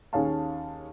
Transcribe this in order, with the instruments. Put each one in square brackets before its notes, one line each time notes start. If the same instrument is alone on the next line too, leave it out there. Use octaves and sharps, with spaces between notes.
[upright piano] D#2 C#4 G#4 F5 A5